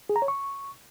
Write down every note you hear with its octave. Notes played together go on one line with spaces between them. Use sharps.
G#4
A#5
C#5
C#6